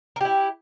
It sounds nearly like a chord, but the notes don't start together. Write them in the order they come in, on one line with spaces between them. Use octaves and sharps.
A#4 G4 E4